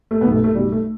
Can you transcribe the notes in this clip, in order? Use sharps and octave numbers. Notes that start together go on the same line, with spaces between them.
A3
B1 B2 B3
A3
A3
B1 B2 G3
A3